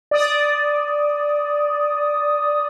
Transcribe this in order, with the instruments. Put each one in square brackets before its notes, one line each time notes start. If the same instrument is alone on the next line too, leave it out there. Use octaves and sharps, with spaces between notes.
[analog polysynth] D5 D#6